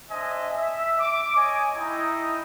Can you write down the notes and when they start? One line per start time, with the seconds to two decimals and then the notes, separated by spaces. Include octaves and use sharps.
0.11 D4 C5 D#5 E5 G#5
0.53 E5
1.00 D6
1.35 C#5 D#5 G#5
1.76 D#4 E4 D#5 G5 A#5 D#6